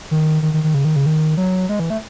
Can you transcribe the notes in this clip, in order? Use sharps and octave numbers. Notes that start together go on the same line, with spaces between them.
D#3
D#3
D#3
D#3
C#3
D#3
C#3
D#3
F#3
G#3
E3
A3